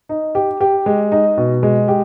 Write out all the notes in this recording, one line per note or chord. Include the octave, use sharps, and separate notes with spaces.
D#4
G4
G4
G#3
D#4
B2
G#3
G4